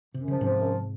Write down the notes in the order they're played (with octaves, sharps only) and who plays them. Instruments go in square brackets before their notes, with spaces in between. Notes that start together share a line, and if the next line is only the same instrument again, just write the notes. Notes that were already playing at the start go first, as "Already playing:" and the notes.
[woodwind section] F#2 [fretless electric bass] C3
[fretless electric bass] C#3 [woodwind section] F3
[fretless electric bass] G#2 C3 [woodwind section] F3
[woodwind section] F#2